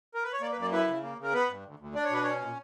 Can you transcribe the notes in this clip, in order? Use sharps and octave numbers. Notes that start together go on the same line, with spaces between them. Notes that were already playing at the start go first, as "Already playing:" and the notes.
A#4
B4
C#5
A#3 D5
B4
F#2
D5
E4 B4
C#3
A#3
C#3 A#4
B3 B4
G2
D2
D2
D4 D5
C#5
B2 B4
C#4 C#5
A#2